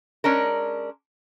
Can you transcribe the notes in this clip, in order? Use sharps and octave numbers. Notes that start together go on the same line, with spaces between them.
G#3 C#4 D4 A#4